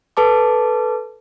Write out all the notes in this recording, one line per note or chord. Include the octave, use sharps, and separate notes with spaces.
A4 B4 A5 D6